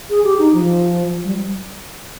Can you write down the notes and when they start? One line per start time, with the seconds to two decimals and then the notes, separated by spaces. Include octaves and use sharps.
0.10 G#4
0.24 G4
0.39 D#4
0.53 F3
1.25 G3